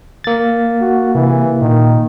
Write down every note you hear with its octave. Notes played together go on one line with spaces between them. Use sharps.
A#3 A6
F#4
C3 E3
A#2 D#3